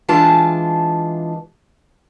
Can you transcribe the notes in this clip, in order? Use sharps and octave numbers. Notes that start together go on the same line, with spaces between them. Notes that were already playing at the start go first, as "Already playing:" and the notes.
E3 G#3 D4 F4 A5